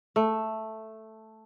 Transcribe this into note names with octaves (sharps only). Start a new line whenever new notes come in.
A3